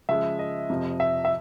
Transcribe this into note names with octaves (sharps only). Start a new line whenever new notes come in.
C#3 F3 G#3 E5
D#5
F2 C3 F3
E5
E5